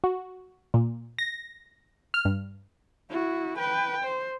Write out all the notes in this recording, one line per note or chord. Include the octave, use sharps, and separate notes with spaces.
F#4
A#2
A#6
F6
G2
E4 F#4
B4 G5
C5